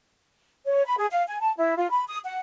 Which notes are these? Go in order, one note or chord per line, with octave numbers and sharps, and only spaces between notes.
C#5
B5
G#4
F5
G#5
A5
E4
F4
B5
D#6
F#5